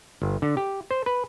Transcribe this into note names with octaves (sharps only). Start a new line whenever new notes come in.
G1
D3
G4
C5
B4